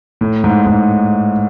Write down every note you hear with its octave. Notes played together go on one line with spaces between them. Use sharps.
A2
G#2
G#2